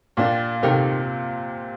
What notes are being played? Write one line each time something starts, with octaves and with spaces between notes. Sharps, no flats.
A#2 A#3 D4 G4
C3 D#3 A3 D#4 G4 A#4